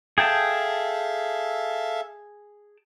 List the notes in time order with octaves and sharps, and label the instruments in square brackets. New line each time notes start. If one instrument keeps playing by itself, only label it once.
[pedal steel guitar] G#4 G5 A5 [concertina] A4 E5 F5